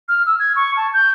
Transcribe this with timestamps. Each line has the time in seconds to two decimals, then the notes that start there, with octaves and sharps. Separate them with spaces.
0.09 F6
0.26 E6
0.39 G#6
0.56 C#6
0.77 A5
0.93 G6